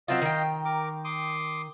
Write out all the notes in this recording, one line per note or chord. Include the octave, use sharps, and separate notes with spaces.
F#3 C4 F4 D#5 F5
D#3 G5
A#4 D6
C6 D6 D#6